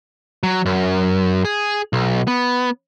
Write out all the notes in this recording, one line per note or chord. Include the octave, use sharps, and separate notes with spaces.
F#3
F#2
G#4
B1
B3